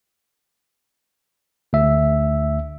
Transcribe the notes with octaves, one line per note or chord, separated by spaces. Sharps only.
D2 E5